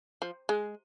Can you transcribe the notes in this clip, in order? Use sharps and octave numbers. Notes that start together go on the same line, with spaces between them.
F3
G#3